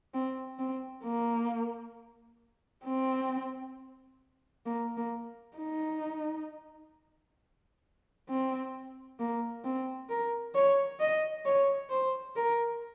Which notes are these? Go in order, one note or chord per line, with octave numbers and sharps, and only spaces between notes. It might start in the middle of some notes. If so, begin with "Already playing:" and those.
C4
C4
A#3
C4
A#3
A#3
D#4
C4
A#3
C4
A#4
C#5
D#5
C#5
C5
A#4